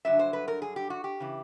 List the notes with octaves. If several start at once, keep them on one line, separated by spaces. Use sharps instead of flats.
G2 D3 F#3 E5
C5
B4
A#4
G#4
G4
F#4
G4
C#3 E3